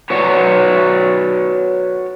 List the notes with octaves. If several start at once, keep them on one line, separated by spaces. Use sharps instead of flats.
F#4 B4 C#5 D5 F#5